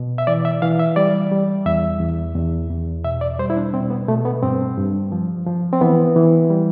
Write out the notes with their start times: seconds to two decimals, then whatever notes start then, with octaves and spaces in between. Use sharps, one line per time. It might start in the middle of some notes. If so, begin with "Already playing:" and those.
Already playing: B2
0.18 E5
0.27 E3 D5
0.45 E5
0.62 E3 F5
0.79 E5
0.96 G3 D5
1.31 G3
1.66 E2 E5
2.00 E2
2.35 E2
2.70 E2
3.04 B2 E5
3.21 D5
3.39 G3 C5
3.50 E4
3.57 D4
3.73 B2 C4
3.90 B3
4.08 B2 A3
4.25 B3
4.43 G2 C4
4.77 G2
5.12 F3
5.47 F3
5.73 C4
5.81 E3 B3
6.16 E3
6.50 G3